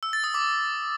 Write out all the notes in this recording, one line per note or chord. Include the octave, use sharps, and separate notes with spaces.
E6
A6
D#6
D6